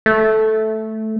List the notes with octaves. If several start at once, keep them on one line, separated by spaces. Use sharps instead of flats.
A3